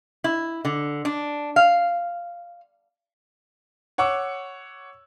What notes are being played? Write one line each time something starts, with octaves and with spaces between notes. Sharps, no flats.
E4
D3
D4
F5
C#5 F#5 C#6 D6 E6